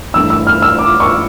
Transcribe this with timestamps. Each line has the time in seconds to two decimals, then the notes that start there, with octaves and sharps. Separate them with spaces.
0.14 G2 E3 A3 D4 E6
0.30 E6
0.47 F6
0.62 E6
0.79 D6
1.00 C#6